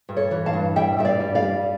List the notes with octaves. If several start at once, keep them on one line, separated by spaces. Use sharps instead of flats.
G2
A4 C#5
E3
F5 A5
G2
G3 E5 G5
G2 E5
D5 F5
G3
D5 F5
G3